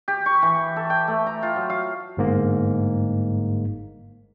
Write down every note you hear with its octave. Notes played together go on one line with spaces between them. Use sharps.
G4
C#6
E3
A4
G5
A3
A#5
F4
F#3
F5
G1 G#2 A#3